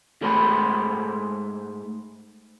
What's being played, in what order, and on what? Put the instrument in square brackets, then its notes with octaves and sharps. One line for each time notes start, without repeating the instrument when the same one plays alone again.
[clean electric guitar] G#2 G#3 A3 C5 A#5 B5